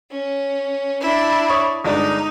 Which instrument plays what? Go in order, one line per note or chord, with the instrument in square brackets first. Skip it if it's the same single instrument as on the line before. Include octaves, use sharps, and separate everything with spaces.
[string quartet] C#4
D4 E4
[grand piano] C#5 C#6 D#6
[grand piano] G1 G#3 D4 [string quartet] D#4